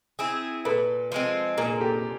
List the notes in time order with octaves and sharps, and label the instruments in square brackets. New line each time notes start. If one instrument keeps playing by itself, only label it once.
[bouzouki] C4 E4 G#4
[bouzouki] A#2 [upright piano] A4 B4
[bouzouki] F3 G#3 C4
[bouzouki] A#2 [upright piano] G#4 A#4
[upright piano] A#4
G4 A4